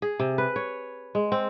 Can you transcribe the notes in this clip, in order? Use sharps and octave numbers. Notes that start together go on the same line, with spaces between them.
G#4
C3
B4
C#5
G#3
C4